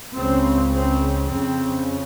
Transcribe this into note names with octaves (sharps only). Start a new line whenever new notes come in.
C#2 C#3 C4
C4
F2 C#3 C4